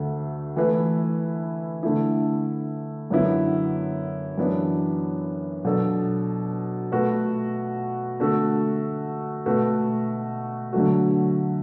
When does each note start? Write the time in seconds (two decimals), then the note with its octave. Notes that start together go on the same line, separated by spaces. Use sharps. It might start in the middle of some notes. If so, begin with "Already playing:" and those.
Already playing: D2 D3 A3
0.56 E3 A3 E4 B4
1.83 D3 A3 E4
3.10 F#2 D3 B3 E4
4.37 F#2 E3 B3 D4
5.64 B2 F#3 D4 A4
6.92 B2 A3 F#4 B4
8.19 D3 A3 F#4 A4
9.46 B2 A3 F#4 B4
10.73 D3 F#3 A3 F#4